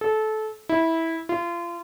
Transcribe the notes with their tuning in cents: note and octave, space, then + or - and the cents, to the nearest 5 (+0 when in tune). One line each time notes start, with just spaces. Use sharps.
A4 -20
E4 -15
F4 -30